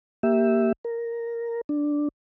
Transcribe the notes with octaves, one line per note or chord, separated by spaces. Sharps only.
A#3 G4 E5
A#4
D4